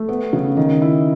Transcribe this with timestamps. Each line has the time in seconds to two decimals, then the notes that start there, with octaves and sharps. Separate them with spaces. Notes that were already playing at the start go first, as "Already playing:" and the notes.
Already playing: A3
0.09 B3
0.33 C#3
0.57 D#3
0.82 E4